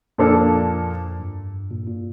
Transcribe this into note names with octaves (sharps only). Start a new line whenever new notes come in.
F2 A#2 F3 A#3 D4 A4
G2
A#2
A#2